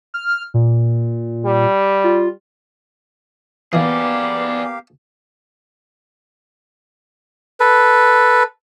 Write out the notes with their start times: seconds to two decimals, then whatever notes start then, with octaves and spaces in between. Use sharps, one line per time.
0.14 F6
0.54 A#2
1.45 G3
2.04 F4
3.73 A#2 E3 A#3 B3 G4 G#4 D5 F5
7.60 A4 B4